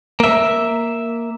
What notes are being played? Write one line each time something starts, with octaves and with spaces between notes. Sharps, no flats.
A#3 E5